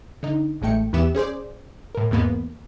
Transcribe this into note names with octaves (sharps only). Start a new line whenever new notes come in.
D3 D#4
A1 G#3 A3 G5 C#7
E2 E3 B3 G4 E5 E7
C#4 G#4 C5 D5
A2 A#4
E2 G#2 A#3 B3